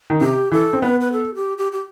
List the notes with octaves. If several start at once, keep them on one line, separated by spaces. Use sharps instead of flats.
D#3
C3 G4
E3 A4
C4
B3 B4
B4
A4
G4
G4
G4